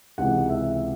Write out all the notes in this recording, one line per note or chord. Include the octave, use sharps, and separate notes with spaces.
C#2 C3 E3 F#5
E5